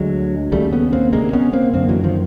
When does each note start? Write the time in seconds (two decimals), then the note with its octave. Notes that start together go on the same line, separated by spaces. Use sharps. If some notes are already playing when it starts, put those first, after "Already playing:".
Already playing: D2 D3 F#3 G#3
0.52 D#2 C#3 G3 A3
0.72 B3 C#4
0.93 A#3 C4
1.13 D2 C3 G#3 A#3
1.33 B3 C#4
1.53 A#3 C4
1.73 F#2 D3 A#3 C4
1.89 E3 F#3
2.04 D#3 F3